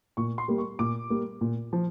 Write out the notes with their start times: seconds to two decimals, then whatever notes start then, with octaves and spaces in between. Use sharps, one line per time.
0.17 A#2 C#6
0.38 C6
0.48 G3 A#3
0.58 C#6
0.79 A#2 D6
1.10 G3 A#3
1.41 A#2
1.73 F3